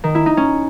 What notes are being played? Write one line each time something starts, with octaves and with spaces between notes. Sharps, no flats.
D#3
E4
D#4
C#4